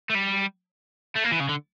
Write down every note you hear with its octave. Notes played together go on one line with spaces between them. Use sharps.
A3
G3
A3
A#3
E3
C#3
D3